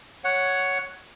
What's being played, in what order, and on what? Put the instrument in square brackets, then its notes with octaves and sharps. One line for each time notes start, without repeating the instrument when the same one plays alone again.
[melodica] C#5 F#5